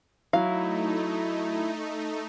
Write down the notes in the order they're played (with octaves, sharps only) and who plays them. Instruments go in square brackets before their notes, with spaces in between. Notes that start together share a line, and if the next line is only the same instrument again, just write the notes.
[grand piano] F#3 [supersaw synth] A3 D#4 [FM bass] E4 [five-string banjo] F5